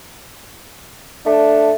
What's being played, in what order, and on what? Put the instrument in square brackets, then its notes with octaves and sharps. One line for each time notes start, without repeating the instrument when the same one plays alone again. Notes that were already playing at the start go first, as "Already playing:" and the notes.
[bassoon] A3 [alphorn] D4